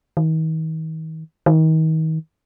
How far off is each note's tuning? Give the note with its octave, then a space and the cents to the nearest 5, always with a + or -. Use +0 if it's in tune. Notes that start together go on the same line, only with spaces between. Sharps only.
D#3 +40
D#3 +35